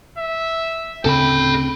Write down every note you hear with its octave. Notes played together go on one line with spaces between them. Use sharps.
E5
D2 C#3 C4 A4 G5 B5